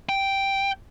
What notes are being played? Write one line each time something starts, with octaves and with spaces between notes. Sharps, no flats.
G5